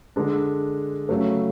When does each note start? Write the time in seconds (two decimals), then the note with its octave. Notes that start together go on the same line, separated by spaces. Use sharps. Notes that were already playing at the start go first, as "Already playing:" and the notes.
0.16 D3 G#3 D4
1.09 C#3 F#3 A3